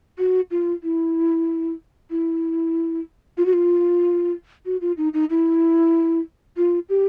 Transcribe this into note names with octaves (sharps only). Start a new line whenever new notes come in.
F#4
F4
E4
E4
F4
F#4
F4
F#4
F4
D#4
D#4
E4
F4
G4